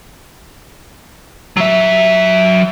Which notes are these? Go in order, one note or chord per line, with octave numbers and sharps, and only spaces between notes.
F#3 E5